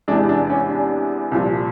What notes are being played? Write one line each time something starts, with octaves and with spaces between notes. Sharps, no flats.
E2 C3 E3 G#3 D4
D4
C#4
D4
C2 A#2 F3